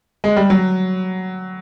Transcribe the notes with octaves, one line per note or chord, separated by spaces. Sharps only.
G#3
G3
F#3